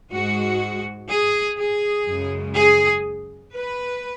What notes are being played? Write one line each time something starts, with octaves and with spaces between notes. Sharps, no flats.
G#2 G#3 F#4
G#4
G#4
F#2 C#3 G#3
G#4
B4